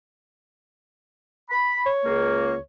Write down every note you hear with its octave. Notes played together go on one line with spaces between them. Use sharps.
B5
C#5
C#2 A#3